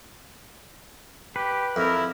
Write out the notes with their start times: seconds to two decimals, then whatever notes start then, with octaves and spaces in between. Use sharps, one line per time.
1.36 G4 B4
1.76 F2 E4 A#4